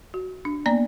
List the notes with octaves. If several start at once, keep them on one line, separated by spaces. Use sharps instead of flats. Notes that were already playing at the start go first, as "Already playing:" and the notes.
F#4
D4
A#3 B3 D5 A#5